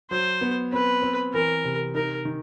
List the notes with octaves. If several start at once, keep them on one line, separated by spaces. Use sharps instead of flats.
F#3 C5
B3
C4 B4
C4
E3 A#4
C3
D#4 A#4
D#3